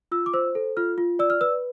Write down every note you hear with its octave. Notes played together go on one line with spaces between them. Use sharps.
F4 E6
D6
C5 E6
A4
F4 F6
F4
D5 E6
F6
B4 E6